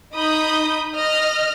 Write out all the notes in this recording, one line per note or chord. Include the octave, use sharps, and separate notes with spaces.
D#4 B5 D#6 G6
D#5 F6